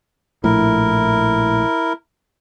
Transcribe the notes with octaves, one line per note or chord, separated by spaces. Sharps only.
A#1 A2 E4 A#4